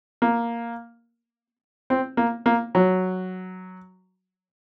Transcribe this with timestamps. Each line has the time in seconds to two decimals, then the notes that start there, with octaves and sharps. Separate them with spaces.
0.22 A#3
1.90 C4
2.17 A#3
2.46 A#3
2.75 F#3